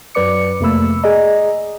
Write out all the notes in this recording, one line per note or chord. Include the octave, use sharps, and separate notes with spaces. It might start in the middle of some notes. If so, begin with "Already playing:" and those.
F#2 F#3 B4 D5 D6 C#7
F2 C3 A3 A#3 B5 E6
G#4 D5 D#5 A#5